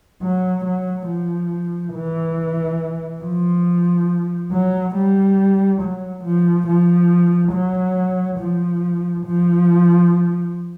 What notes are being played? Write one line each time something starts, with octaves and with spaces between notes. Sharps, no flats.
F#3
F#3
F3
E3
F3
F#3
G3
F#3
F3
F3
F#3
F3
F3